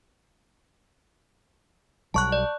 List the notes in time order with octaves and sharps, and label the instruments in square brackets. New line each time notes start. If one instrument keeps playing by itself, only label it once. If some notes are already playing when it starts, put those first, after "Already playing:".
[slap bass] B1 F#3 G3 [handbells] A5 C#6 F#6
[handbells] D5